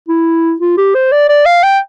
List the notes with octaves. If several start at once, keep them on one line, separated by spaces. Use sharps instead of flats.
E4
F4
G4
C5
D5
D5
F5
G5